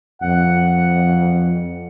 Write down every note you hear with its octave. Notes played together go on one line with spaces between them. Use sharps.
F2 F#5